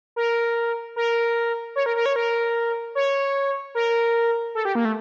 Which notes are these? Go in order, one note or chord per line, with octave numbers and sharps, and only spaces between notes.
A#4
A#4
C#5
A#4
A#4
C#5
A#4
C#5
A#4
A4
G4
A#3
A3